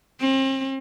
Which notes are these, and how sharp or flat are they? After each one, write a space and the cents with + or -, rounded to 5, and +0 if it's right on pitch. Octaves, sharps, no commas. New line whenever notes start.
C4 +40